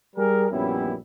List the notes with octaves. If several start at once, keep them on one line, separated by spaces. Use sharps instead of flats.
G3 G#4 A#4
A#1 F#2 G3 B3 C#4 E4